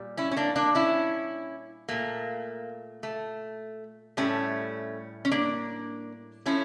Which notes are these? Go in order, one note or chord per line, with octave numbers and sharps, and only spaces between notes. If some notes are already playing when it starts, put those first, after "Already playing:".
Already playing: A#2 G3
C#4 E4
C#4
A#3 D4
A#3 D4
C#4 E4
A#2 A3 A#3
A3
A2 G3 A3 C#4
C#4
A#3 D4
F3 A3 C#4 E4